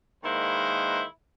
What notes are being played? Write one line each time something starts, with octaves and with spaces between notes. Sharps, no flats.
D#3 G#3 A#3 E4 B4 C5